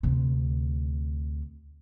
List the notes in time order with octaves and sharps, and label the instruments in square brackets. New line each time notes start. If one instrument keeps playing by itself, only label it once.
[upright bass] D2 C3